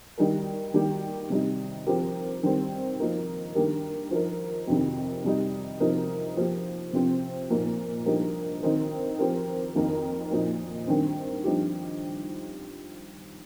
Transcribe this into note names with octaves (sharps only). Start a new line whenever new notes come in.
D#3 G3 D#4 A#4
D#3 G3 A#3 G4
C3 G3 D#4
F3 C4 G4 A#4
D#3 G3 C4
F3 A#3 D#4 A#4
G2 D#3 A#3 G4 A#4
F3 D#4 A#4
F2 C3 D#3
C3 G3 D#4
C3 F3 D#4 A#4
F3 A#3 G4
C3 F3 C4
A#2 F3 A#3 D#4 A#4
G2 F3 D#4 G4 A#4
D#3 C4 D#4 A#4
F3 C4 G4 A#4
F2 D#3 A#3 D#4 A#4
A#2 F3 D#4
G2 D#3 C4
G2 F3 D#4 G4